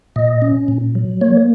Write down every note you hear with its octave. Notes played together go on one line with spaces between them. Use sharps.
A#2 D#5
C#4
A#2
F#3
A#3 C#5